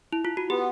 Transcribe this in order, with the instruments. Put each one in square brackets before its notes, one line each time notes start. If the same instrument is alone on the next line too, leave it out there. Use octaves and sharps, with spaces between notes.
[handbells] E4
F4
F#4
[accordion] B3 [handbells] G4